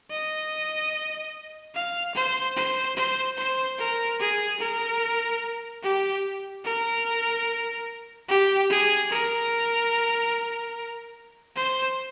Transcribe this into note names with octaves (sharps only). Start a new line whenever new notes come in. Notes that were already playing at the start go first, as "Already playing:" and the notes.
D#5
F5
C5
C5
C5
C5
A#4
G#4
A#4
G4
A#4
G4
G#4
A#4
C5